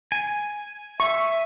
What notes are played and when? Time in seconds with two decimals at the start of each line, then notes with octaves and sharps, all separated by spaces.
0.12 G#5
1.00 E5 C#6